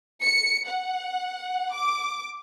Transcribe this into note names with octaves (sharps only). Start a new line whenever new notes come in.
C#7
F#5
D6